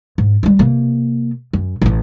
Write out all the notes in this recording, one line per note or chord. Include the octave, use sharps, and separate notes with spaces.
G#2
G3 G#3
C3 A#3
F#2
A1 A2